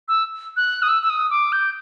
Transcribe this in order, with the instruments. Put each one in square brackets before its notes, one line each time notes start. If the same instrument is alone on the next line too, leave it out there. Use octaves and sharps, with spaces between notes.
[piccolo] E6
F#6
D#6
E6
E6
D#6
D6
G6